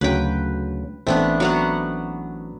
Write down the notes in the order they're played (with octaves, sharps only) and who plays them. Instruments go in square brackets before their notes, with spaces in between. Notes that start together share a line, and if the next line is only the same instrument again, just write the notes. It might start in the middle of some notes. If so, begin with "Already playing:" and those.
[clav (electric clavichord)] D2 C#3 F#3 [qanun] B4 G5
[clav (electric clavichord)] A1 C4 [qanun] A3 B3 D4
[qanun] F#3 B3 F#5